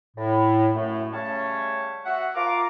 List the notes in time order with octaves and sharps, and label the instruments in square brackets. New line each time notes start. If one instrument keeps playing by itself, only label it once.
[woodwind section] A2
F#2 A2 A3
C#3 G3 A3 C#4 C#5 A5
F#4 E5 F#5
F4 A#4 F5 A#5 D6